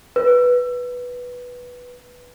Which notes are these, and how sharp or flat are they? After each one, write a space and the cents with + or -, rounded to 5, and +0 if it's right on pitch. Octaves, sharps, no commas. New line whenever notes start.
B4 -5